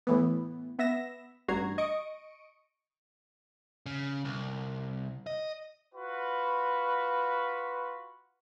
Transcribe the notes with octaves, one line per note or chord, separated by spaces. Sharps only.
A2 E3 B3
B3 E5 A#6 E7
A1 G2 F#4 A#5 G#6 C7
D#5 C#6 D#6 C#7 D7
C#3
C2
D#5
F4 F#4 B4